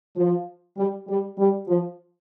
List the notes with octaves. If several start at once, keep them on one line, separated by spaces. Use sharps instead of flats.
F3
G3
G3
G3
F3